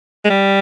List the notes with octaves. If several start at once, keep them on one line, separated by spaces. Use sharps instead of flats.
G#3
G3